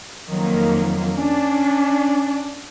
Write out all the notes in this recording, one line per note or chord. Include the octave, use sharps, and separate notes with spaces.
F2 D#3 F#3 A#3
C#4 D4